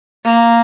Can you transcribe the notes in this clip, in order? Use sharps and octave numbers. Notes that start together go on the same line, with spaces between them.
A#3